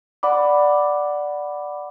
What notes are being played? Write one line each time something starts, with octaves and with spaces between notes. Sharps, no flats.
D5 F#5 B5 D6